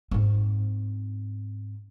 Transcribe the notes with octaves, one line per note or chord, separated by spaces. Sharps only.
G#2 C4